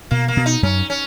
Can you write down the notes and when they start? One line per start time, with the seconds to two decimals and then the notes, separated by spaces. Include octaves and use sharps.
0.11 B2 A#3
0.28 A#3
0.37 B2
0.46 D#4
0.63 F#2 C#4
0.90 C#4